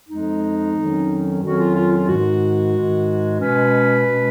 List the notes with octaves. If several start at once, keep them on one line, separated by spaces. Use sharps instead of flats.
F2 F3 G#3 D#4
F2 D#3 F#3 C#4
F2 D#3 F#3 C#4 F#4
F4
F4
F4
G#2 D#3 G#3 F#4
G#2 D#3 G#3
B2 G#3 C#4 B4
B2 G#3 C#4